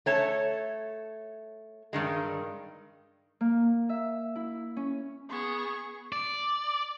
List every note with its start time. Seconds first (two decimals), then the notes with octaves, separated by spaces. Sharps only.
0.06 A3 C#5 A5
1.93 G2 D#3 G#3
3.41 A#3
3.89 E5
4.36 E4
4.77 C#4
5.30 B3 G#4 C#6
6.12 D5